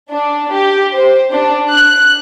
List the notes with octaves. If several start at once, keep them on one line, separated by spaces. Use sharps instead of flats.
D4
G4
C5
D4
F#6